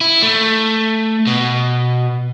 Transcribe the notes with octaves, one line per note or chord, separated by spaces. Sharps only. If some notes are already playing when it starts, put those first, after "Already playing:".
E4
A3
B2